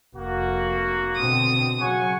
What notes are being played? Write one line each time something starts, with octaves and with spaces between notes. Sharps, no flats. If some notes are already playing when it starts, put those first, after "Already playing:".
F1 A#3 F#4
B2 D3 C4 D#6
C#3 F#3 F#5 G#5 C#6